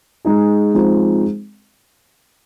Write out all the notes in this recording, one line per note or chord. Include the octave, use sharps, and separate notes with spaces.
G#3 D#4 G#4
F3 G#3 C4 D#4